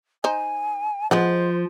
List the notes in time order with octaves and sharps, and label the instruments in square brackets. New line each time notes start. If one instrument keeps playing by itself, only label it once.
[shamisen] D#4 C5 [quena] G#5
[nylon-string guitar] F3 [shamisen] G#3 B3 F#5 [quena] C5